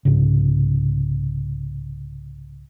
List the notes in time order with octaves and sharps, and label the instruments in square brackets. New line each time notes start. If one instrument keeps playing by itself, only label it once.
[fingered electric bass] C2 G#2 C#3